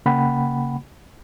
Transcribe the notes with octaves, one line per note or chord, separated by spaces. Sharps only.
C#3 A#3 F#5 G5 B5